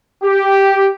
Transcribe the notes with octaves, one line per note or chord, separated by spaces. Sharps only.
G4